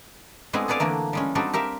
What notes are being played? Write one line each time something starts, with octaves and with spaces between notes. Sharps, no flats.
G#3 A3 B3 C4 D4 E4
G#4 A4 B4 D5 F5 G#5
D3 E3 A3 A#3
G3 G#3 C#4
G3 C4 D4 D#4 F#4 A4
G4 A#4 E5 F5